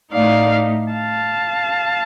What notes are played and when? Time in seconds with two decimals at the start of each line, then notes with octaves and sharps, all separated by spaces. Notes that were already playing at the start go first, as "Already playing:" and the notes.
0.12 A2 A3 D#4 D5 F5
0.93 F5 A5